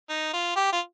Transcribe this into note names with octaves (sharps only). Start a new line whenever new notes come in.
D#4
F4
G4
F4